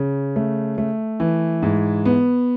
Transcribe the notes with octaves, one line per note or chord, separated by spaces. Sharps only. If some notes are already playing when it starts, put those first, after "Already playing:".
Already playing: C#3
A3
A3
E3
G#2
B3